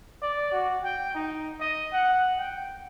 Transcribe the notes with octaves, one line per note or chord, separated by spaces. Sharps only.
D5
F#4
G5
D#4
D#5
F#5
G5